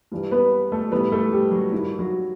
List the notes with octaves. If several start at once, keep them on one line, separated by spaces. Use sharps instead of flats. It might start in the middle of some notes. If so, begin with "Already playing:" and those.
G2 E3 G3
B3 B4
A3 A4
A2 E3 G3 B3 B4
A3 A4
G3 G4
F#3 F#4
G2 D#3 G3 E4
F#3 F#4